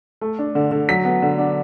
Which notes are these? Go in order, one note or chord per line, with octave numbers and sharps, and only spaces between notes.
A3
D4
D3
D3
F#3 B6
B3
D3
D4